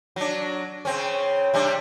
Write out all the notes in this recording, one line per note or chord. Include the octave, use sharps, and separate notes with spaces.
F#3 D4
C#3 C4 C#4
C3 G3 D4